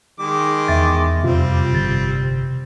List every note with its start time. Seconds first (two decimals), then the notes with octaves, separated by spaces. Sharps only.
0.20 D#3 G#3 D6
0.68 E2 E5 A6
1.23 F2 C3 G3 C4 F4
1.73 G1 C3 A6